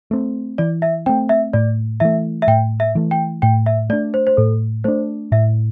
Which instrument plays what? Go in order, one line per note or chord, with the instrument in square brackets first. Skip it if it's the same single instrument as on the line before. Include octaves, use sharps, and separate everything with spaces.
[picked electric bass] A3 C4
[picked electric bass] E3 [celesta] D5
[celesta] E5
[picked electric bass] A3 C4 [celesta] G5
[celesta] E5
[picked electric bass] A2 [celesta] D5
[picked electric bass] E3 A3 [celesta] E5
[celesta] E5
[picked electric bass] A2 [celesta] G5
[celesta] E5
[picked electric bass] E3 A3
[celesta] G5
[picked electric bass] A2 [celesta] G5
[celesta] E5
[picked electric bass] A3 [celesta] D5
[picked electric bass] D4
[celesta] C5
C5
[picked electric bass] A2 [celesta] A4
[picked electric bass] A3 D4 [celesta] C5
[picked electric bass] A2 [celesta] E5